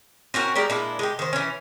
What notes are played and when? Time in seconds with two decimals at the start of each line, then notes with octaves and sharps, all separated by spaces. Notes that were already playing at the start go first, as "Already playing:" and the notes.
0.34 C4 C#4 F#4 A#4
0.55 G#3 G4 A#4 D5
0.70 A#2 G#3 D4 E4
0.99 G#3 G4
1.19 D#3 C5
1.33 E3 C#4